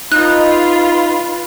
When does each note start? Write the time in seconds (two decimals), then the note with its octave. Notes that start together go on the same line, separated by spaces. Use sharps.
0.12 D#4 F4 B4 F#6